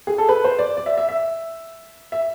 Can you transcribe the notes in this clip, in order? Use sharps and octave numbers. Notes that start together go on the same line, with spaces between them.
G#4
A4
B4
C5
D5
D5
E5
E5
E5
E5